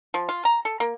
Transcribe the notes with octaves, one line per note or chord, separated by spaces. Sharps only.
F3
F4
A#5
A4
A#3